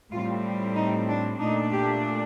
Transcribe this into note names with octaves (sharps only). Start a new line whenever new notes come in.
A2 G3 C4 F4
D#4
D4
A#2 A3 D4 D#4
G4